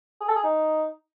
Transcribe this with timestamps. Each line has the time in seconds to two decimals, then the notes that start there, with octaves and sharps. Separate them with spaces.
0.21 G#4
0.28 A4
0.36 G#4
0.44 D#4